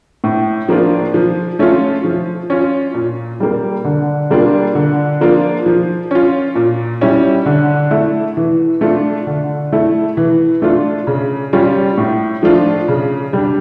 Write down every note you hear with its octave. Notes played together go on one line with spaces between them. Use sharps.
A2
F3 A#3 D4 F4
F3
A3 C#4 F4
F3
C#4 F4
A#2
G3 A#3
D3
G3 A#3 D4 F4
D3
F3 A#3 D4 F4
F3
C#4 F4
A#2
G3 C#4 E4
D3
A3 E4
E3
A3 D4 F4
D3
A3 E4
E3
A3 D4 F4
C#3
G3 C#4 F4
A2
F3 A3 D4 F4
C#3
G3 D4